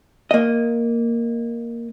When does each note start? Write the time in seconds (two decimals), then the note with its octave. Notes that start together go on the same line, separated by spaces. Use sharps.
0.31 A#3 D#5